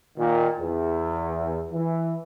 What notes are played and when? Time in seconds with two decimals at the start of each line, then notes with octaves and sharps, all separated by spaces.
0.17 A#2 D#3
0.59 E2
1.71 E3